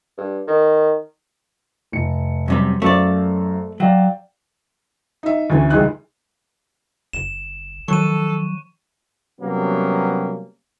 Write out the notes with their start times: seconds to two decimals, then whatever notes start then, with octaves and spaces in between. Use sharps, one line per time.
0.18 G2
0.48 D#3
1.92 F1 C#7
2.48 F#2 C3 G3
2.82 F#2 A3 C5 D5 F5
3.80 F#3 D5 F5 G5
5.23 D#4 E5
5.50 D2 E3 C#4
5.70 C#2 E3 G3 G#3 D#4 F#6
7.13 F#1 E7
7.88 D#3 F3 F#3 A4 C#6 F#6 D#7
9.41 C3 F#3 G3 A#3 B3 C#4